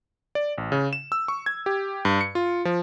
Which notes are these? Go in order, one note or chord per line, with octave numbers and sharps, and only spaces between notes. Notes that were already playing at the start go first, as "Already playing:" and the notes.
D5
A1
C#3
E7
E6
C#6
G#6
G4
G2
C#7
F4
F3